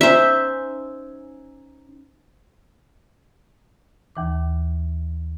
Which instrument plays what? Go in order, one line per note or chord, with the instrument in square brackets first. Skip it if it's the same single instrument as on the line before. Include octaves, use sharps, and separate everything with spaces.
[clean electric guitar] C#4 D#4 G#5 [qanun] C5 E5
[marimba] D#2 E3 D6